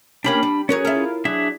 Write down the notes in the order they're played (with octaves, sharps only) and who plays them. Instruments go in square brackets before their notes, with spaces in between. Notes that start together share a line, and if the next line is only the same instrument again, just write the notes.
[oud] A#3 C#4 G4 [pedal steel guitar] D4 B5
[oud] G3
[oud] F#3 A#4 C#5 [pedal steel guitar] C#4 G#4
[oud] E4 F4 A#4
[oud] F#3 [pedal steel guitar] D4 G#4 E5